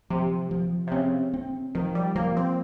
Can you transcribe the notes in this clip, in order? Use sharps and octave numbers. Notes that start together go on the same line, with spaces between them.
C3 F3
F3
C3
C#3 C4
C4
D#3 F3
G3
F3 A#3
C4